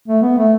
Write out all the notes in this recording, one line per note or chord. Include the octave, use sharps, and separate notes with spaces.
A3
B3
A3